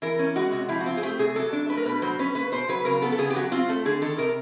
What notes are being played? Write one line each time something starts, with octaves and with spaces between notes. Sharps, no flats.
E3 A#4
C#4
G#3 F#4
C3
F3 E4
F#4
C4 F4
G#4
A3 G4
C3 G#4
F#3 A4
D4
A3 B4
A#4
B2 B4
F#3 C5
C#4 B4
A#3 B4
B2 C5
F#3 B4
C#3 A#4
B3 A4
A4
C#3 G#4
G4
F#3 F#4
C4 F4
A3 A4
D3 G#4
D#3 A4
C3 A#4